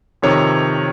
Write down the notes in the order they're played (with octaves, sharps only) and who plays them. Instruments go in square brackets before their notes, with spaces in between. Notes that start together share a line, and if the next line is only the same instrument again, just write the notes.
[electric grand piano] F2 C3 D#3 C#5